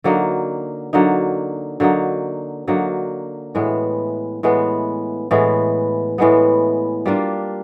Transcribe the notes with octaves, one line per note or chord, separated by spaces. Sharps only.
D3 F#3 A#3 D#4
D3 F#3 A#3 D#4
D3 F#3 A#3 D#4
D3 F#3 A#3 D#4
A2 E3 G#3 B3
A2 E3 G#3 B3
A2 E3 G#3 B3
A2 E3 G#3 B3
G3 A#3 D4 F4